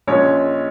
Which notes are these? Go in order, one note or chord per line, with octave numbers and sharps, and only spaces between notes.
A#1 A#2 G#3 C#4 C#5